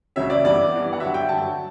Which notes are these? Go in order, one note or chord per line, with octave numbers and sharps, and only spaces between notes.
C#2 C#3 F#3 C#4 E5
D5
G2 E3 B3 D5
G2 E3 B3
F#5
G2 D3 F#3 E5
G5
G2 D3 F#3 A5